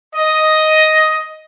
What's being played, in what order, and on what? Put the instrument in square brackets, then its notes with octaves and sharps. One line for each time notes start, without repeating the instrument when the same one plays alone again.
[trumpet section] D#5